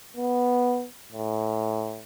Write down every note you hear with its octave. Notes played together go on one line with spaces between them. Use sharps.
B3
A2